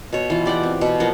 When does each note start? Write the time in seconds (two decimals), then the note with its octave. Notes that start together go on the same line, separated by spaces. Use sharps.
0.12 B2 C#5
0.30 E3 F4
0.46 G4 D5 F#5 G5
0.63 C4
0.81 B2 B4
1.00 F3 A#3 F#4